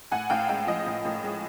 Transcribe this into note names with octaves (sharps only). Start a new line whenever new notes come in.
A2 F#5 G#5
A2 F5 G5
G#3 F5 G5
F3 D#5 F5
A2
A2
G#3